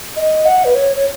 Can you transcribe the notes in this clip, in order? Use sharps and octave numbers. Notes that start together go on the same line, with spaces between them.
D#5
F#5
B4
C#5
C#5